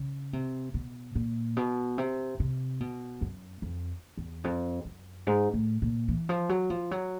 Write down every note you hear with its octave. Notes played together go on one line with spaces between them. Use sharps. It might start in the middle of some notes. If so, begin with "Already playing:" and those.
Already playing: C#3
C3
B2
A#2
B2
C3
C3
B2
F#2
F2
E2
F2
F#2
G#2
A2
A#2
E3
F3
F#3
F3
F#3